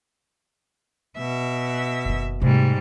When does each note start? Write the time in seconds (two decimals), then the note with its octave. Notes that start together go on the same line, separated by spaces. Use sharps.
1.18 B2 E5
2.05 F#1 D#3
2.42 G#2 C3 G3 A3